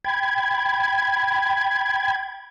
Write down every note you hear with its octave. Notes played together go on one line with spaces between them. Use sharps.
G5 B5 G#6